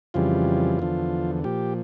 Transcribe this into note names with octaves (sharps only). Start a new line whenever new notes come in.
F2 C#3 E3 G3 F4
E2 D3 F3
A#2 F3 G4